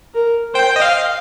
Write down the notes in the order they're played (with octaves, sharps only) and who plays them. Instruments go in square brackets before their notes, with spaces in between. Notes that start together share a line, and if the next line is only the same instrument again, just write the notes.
[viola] A#4
[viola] C5 [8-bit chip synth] G5
[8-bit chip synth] D#5
F5